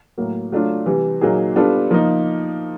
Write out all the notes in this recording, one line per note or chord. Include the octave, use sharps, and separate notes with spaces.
A2 F#3 A#3
F#3 A3 D4 F4
C3 E3 G3
A#2 F#3 A#3 D#4 G#4
G3 B3 D4 F4 A4
F3 A#3 D#4